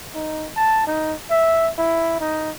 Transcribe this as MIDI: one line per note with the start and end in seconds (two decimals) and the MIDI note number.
0.14 0.47 63
0.56 0.83 81
0.87 1.13 63
1.30 1.70 76
1.78 2.20 64
2.20 2.51 63